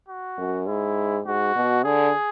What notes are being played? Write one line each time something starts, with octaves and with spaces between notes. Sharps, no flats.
F#4
F#2
G#2 E4
G#2 F#4
B2
D3 G#4